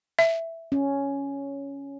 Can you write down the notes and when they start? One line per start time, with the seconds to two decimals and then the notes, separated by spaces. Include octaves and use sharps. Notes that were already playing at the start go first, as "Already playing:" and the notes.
0.19 E5
0.72 C#4